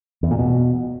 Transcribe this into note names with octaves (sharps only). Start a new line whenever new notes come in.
E2
A#2
B2